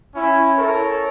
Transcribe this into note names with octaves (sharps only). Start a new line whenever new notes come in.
C#4 E4
A4 A#4 C#5